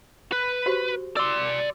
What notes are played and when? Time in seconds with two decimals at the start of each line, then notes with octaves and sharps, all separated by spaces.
0.32 B4
0.66 F#4 G4 C5
1.17 D5 C6 D6 E6